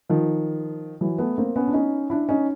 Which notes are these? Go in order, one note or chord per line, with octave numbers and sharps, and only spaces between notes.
D#3 F3
E3 F#3
A3 B3
A#3 C4
B3 C#4
D4
C#4 D#4
D4 E4
C#4 D#4